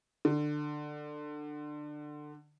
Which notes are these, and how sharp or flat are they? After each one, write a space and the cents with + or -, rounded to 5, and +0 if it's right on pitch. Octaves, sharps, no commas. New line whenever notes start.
D3 +25